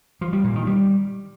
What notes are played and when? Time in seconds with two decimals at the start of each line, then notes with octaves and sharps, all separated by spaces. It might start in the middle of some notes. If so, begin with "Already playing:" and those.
0.21 F3
0.33 G3
0.44 A#2
0.56 D#3
0.67 G3